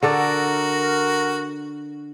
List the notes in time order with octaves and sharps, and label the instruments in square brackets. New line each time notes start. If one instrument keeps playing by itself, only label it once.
[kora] D3 A4 D5 [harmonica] F#4 [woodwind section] A#4